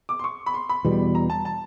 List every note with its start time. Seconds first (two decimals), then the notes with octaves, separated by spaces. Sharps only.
0.09 D6
0.19 C6
0.24 C#6
0.46 B5
0.54 C6
0.69 B5
0.85 E2 B2 G3
1.15 A#5
1.30 A5
1.45 A5